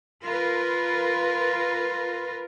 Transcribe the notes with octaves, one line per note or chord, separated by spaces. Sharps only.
F4 A#4 B4